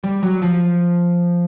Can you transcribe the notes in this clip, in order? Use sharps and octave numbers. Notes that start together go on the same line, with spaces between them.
G3
F#3
F3